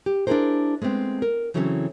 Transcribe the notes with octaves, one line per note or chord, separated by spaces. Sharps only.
G4
D4 E4 F4 G#4 A#4 C5
G#3 A3 B3 C4
A#4
C#3 E3 F#3 C4 C#4 A4